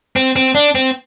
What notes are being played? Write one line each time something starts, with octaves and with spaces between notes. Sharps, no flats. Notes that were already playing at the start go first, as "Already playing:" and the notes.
C4
C4
D4
C4